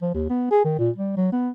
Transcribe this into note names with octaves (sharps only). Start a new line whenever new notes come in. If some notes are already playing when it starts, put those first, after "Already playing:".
F3
D#2
B3
G#4
D#3
A#2
G3
F#3
B3